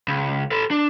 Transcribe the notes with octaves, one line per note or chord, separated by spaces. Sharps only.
C#2
A4 B4
D4